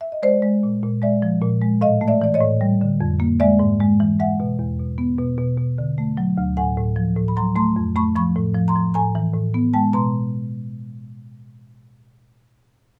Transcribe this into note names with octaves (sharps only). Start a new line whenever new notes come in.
E5
D#5
G#3 C5 D5
G#3
A#2
A#2
G#3 D5 E5
F3
A#2
G#3
A2 D#5 F5
A3
D5 E5
E3 D5
C#5 D#5
A2
G3
D3
F2
A#3
G#3 D5 E5
G#2
G#3
E3
G#3 E5 F#5
B2
E2
B2
B3
B2
B2
B2
D3
A3
F#3
D2
A2 F#5 G#5
A2
F3
A2
B5
F#3 A#5 C6
A3 A#5 C6
F2
A3 B5 C#6
F3 B5 C#6
A2
F3
A#5 C6
F3
A2 G#5 A#5
E3
A2
B3
G#3 G5 A5
B2 A#5 C6